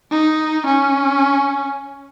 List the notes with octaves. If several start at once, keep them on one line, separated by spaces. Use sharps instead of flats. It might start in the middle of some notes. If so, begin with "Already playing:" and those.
D#4
C#4